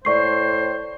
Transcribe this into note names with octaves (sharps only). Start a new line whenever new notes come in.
A2 C5 D5 C#6 C7